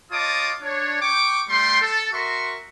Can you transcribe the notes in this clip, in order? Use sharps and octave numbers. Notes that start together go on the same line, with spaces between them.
F4 C#5 D#5 A5 D6 D#6
D4 C#5
G5 C#6 D6
G3 A3 G5 C6
A4
F#4 A#4 E5 C6 C#6